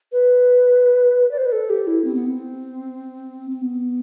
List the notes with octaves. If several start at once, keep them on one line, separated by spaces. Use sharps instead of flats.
B4
D5
C5
B4
A4
G4
E4
C4
B3
C4
C4
B3